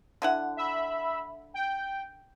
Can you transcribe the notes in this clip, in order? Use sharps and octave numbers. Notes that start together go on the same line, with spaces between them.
D3 E4 F#5
E5 B5
G5